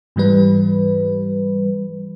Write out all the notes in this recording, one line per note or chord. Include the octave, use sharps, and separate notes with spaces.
G#2 E3 G3 B4